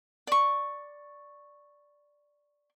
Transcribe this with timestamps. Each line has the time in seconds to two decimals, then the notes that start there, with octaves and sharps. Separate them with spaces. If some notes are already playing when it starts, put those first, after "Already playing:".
0.27 D5 C#6